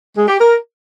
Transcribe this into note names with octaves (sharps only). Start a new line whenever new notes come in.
G#3
G4
A#4